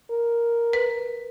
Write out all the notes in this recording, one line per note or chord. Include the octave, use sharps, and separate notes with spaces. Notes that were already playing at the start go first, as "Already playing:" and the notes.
A#4
B4